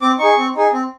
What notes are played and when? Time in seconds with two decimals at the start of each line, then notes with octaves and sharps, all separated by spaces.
0.02 C4 D6
0.19 D#4 G#4 C#6
0.38 C4
0.55 D#4 G#4
0.73 C4